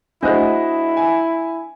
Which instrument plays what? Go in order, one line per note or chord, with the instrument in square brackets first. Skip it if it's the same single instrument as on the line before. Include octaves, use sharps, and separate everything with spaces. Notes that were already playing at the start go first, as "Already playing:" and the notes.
[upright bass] A3 [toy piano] D4 C5 [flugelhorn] E4 [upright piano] F#4 G#4 D#5
[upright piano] G#5